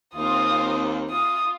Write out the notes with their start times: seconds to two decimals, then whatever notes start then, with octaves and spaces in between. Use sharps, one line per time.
0.15 D#2 C4 F4 D#6
1.10 F4 D#6